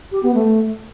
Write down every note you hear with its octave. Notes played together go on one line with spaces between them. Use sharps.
G4
B3
A3